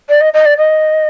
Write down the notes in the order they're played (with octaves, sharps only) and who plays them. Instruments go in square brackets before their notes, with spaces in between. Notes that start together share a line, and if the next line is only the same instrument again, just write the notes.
[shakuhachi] D5
D#5
D#5
D5
D#5